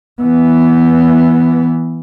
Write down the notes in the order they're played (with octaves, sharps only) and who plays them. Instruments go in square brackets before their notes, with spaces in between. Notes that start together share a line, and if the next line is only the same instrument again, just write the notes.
[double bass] E3 B3